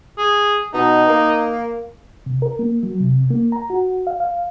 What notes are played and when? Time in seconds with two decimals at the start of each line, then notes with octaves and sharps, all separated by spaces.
0.18 G#4
0.74 B2 D#4
1.08 A#3
2.26 C3
2.42 A#4
2.59 A#3
2.83 F#3
3.01 C3
3.30 A#3
3.52 A#5
3.70 F#4
4.07 F5
4.20 F5